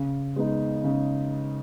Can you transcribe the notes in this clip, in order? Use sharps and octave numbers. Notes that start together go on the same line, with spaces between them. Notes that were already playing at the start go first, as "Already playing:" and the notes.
Already playing: C#3
G#3 B3 D#4
C#3